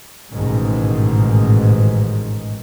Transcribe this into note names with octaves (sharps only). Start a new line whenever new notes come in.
A1 G#2 B2 D#3 G#3